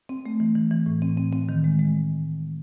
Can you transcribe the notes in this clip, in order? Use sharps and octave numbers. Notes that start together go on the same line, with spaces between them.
C4
A3
E3
E3
E3
A2
C4
C4
C4
D#3
G#3
G#3